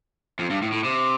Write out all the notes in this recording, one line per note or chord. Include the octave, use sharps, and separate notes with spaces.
F2
G2
A2
A2
C3